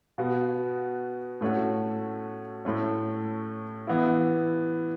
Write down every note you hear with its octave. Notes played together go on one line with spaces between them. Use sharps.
B2 B3 F#4
A2 A3 C#4 F#4
A2 A3 C#4
E3 B3 E4